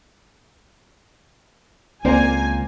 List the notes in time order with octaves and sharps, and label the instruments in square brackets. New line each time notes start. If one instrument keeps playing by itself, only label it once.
[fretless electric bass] C#2 C4 [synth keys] A#3 [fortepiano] C5 D5 [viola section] G#5